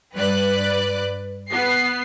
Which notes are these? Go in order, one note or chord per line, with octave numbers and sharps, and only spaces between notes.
G2 B4 D5 F#6
B3 C7